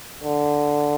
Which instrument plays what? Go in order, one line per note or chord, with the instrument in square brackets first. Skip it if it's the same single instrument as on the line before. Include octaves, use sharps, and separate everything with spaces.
[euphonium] D3